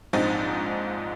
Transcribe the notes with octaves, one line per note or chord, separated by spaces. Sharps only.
A#1 G#2 F3 C4 D#4